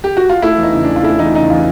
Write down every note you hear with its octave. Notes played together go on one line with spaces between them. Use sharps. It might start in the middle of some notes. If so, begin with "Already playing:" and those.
G4
F#4
F4
A3 E4
E2
D#4
C#3
D4
E3
F4
A3 E4
E2 D#4
C#3 D#4
E3 F4